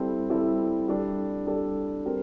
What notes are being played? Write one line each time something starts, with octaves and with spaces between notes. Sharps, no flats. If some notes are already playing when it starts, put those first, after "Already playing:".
Already playing: G3 C4 E4 A4
G3 C4 E4 A4
G3 D4 A4
G3 D4 A4
G3 C4 G4 A#4